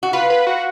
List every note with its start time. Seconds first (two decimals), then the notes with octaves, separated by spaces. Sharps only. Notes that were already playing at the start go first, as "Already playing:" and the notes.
0.03 F#4
0.13 F4 B4
0.30 B4
0.47 F#4